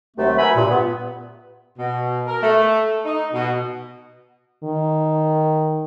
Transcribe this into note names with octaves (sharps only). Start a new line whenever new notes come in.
D#2 C3 F#3 A3
F#4 A#4 B4 E5 G#5 B5
G2 A#2
B3
B2
A#4
A3
D#4
B2
D#3